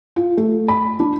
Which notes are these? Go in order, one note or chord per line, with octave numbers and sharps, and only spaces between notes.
F4
A3
B5
D4